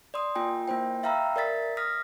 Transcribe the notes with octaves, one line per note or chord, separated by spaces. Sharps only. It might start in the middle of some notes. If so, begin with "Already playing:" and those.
D5 C6 D#6
A#3 F4 G5 G#5
A#3 E4 C5 G5
E5 F5 G5 A#5 B5 E6
A#4 D5 E5 A6 B6
D#6 F6 A#6 B6